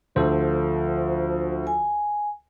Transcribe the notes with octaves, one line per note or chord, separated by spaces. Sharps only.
D2 F3 A4 C5
G#5